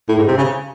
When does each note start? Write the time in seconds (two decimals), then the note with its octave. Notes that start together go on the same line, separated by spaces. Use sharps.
0.09 A2
0.18 G#2
0.28 C3
0.37 C#3